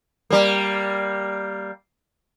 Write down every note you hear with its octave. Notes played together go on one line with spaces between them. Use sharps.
G3 A#3